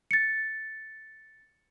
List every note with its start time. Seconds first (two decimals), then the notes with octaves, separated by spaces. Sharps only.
0.11 A6 C#7